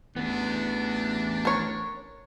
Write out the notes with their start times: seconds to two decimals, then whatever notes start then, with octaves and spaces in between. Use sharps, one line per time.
0.16 A1 E3 B3 D4
1.45 A#4 C#5